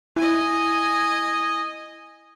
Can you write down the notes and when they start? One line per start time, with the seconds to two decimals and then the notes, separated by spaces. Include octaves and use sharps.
0.16 E4 D#5 G#5